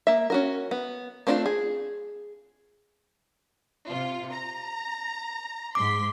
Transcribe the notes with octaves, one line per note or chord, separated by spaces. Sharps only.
A#3 E5
C#4 F#4 A#4
B3
A3 C4 D4 E4 F4
G#4
C3 F4
A#5
G#2 C6 D6 B6